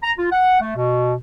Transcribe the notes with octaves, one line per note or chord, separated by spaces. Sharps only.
A#5
F4
F#5
A3
B2